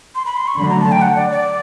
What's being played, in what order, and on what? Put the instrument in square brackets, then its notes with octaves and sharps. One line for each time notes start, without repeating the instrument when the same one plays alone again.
[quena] C6
B5
C6
C#6
[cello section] D3 F#3 A3 [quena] B5
[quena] A#5
A5
G5
F#5
D5
D5